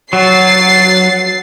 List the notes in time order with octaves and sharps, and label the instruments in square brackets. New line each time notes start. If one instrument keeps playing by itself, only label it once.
[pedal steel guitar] F#3 [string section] A6 C7